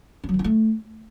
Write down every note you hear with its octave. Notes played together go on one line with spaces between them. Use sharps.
D4
F#3
D#3
E4
A3